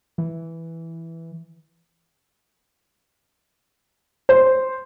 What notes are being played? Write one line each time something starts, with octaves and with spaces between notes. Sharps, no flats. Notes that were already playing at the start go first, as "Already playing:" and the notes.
E3
C5